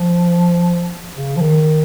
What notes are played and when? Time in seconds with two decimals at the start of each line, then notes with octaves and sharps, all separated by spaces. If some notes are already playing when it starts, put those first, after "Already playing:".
Already playing: F3
1.17 C#3
1.36 F3
1.41 D#3